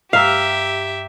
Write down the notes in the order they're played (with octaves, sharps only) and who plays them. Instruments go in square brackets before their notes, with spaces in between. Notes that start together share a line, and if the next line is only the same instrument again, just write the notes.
[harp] G2 A#5 E6 [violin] G4 E5 [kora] F5